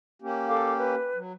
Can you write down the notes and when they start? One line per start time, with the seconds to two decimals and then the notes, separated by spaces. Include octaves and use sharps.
0.22 A#3 C#4 G4
0.48 A4 F5 D6
0.78 B4
1.15 F#3